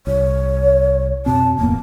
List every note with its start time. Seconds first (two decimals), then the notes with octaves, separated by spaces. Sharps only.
0.07 C2 C#5
1.26 F2 B2 C4 A5
1.59 D1 F2 A#3 B3